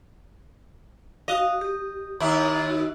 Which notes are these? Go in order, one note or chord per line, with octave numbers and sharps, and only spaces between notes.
F#4 D#5 F5
G4
D#2 E4 A#5
F#4